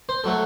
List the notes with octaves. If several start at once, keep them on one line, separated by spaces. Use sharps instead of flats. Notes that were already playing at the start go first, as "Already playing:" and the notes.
C5
F#3 A3 A4